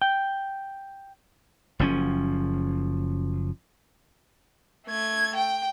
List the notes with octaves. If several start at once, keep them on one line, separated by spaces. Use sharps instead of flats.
G5
F#1 F3 C#4
A3 G#6
G5